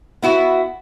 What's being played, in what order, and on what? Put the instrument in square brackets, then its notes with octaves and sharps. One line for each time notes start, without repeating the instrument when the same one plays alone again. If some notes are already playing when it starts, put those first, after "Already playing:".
[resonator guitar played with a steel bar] B3 E4 F#4